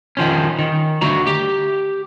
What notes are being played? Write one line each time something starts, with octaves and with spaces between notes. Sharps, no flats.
D#3 F3 C#4
D#3
D2 F#4 A#5
G4